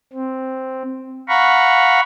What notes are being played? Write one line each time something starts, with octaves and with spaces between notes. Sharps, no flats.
C4
F5 F#5 A#5 B5 C#6